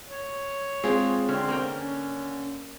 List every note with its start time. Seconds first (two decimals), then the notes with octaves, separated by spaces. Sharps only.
0.07 C#5
0.84 G#3 C4 F4 G#4
1.29 D3 C4 C#4
1.49 A#3 A#4 G5
1.68 C#4